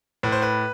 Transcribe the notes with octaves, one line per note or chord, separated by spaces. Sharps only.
A2 B4
C5
B4